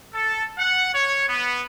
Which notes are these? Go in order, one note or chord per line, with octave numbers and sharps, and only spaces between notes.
A4
F#5
C#5
B3